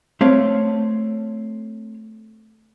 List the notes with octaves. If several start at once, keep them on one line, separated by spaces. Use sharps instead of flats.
A3 C4 C#5 F5